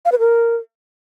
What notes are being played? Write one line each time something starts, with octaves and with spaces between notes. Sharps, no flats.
F5
B4
A#4